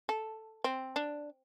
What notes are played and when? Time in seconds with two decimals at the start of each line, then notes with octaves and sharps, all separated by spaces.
0.09 A4
0.64 C4
0.96 D4